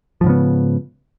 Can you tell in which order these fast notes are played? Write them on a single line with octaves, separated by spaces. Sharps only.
F3 G#2 C#3 B3